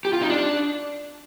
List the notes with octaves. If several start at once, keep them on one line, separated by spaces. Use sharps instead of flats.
G4
F4
D#4
D4